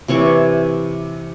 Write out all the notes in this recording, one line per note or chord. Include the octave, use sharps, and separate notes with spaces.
C3 E3 C#5 D6